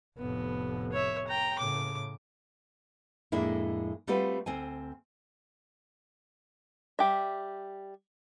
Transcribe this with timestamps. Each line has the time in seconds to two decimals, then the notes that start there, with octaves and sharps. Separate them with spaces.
0.18 F1 A2 B3
0.92 C#5 E5
1.28 G5 A#5
1.59 A2 C#3 D6
3.32 F2 A2 G#3 A#3 D4 E4
4.07 G3 A3 C4 F4 F#4 B4
4.46 D2 C4 C5 G#5
6.99 G3 G4 E5